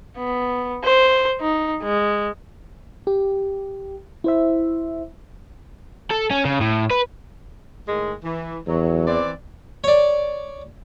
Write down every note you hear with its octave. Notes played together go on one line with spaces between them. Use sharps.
B3
C5
D#4
G#3
G4
E4 C5 E5
A4
C#4
C#3
A2
B4
A2 D#3 G#3
E3
E2 F#3
E3 C4 D5
C#5 D5